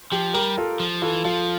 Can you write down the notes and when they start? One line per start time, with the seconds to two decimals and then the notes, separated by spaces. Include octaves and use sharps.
0.12 F3 G4
0.34 G3 G4 A#4
0.58 F4 A4
0.80 F3
1.02 E3 F4 A4
1.25 F3 F4